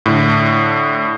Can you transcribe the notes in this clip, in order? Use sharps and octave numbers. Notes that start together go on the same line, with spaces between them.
A2 D3